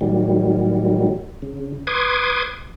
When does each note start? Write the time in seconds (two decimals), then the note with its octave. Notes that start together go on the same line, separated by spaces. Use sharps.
0.01 A2 D#3 F#3 G3
1.42 C#3
1.87 B4 C6 D6 D#6 G#6